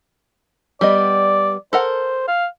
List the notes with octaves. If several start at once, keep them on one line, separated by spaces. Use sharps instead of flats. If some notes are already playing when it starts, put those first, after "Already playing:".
G3 B3 D5 D#5
A4 A#4 C5 F#5
F5